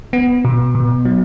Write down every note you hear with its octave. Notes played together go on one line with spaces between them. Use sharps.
B3
B2
B2
F#3